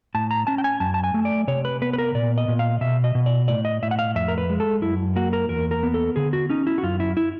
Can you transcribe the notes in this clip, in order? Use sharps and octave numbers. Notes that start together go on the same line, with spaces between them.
A2 A5
A#5
C#4 A5
G5
G#5
F#2 A5
A5
G#5
A3
D5
C3 C#5
B4
B3 B4
B4
A#4
A#2 D5
D#5
A#2
F5
B2 E5
D#5
B2
D5
A2 D5
D#5
A2 E5
F#5
F5
F2 E5
A#4
B4
G#3
A4
F#2 E4
A#3 F#4
A#4
E2 A#4
A#4
B3
A4
D3 G#4
F#4
C#4 D#4
E4
F#4
F#2 F4
E4
E4